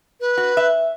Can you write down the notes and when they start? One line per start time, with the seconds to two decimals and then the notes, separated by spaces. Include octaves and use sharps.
0.21 B4
0.37 F#4
0.57 E5